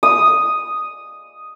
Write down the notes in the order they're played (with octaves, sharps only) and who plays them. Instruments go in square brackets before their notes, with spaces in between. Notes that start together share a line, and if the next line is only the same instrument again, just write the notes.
[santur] D#6